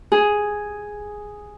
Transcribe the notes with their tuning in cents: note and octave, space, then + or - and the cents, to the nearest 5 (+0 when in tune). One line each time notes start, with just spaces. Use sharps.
G#4 +0